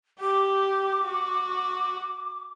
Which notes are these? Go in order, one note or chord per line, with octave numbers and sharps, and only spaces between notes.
G4 D6
F#4